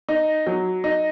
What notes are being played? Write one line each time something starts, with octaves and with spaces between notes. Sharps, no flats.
D#4
F#3
D#4